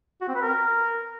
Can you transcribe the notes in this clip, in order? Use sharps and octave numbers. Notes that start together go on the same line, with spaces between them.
F#4
C4
B4
A#4